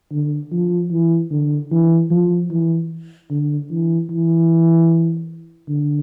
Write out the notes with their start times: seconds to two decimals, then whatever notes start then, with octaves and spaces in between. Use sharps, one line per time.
0.12 D3
0.51 F3
0.91 E3
1.31 D3
1.71 E3
2.11 F3
2.50 E3
3.30 D3
3.70 E3
4.09 E3
5.68 D3